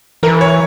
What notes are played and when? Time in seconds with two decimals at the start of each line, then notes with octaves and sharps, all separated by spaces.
0.23 E3 A#4
0.41 C#5